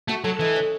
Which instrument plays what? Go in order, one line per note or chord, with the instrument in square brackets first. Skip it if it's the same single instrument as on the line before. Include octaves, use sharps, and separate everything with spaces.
[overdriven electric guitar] A3 [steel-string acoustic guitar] F#4
[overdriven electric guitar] F#3 [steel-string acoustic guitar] A4
[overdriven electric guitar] E3 [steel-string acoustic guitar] G#3
[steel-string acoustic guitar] C#4